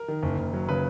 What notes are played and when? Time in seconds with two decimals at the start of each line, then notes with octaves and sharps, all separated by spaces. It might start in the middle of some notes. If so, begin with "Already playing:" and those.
Already playing: A#4
0.08 D#3
0.22 F#1
0.37 F#1
0.54 F#3
0.69 C#3 B4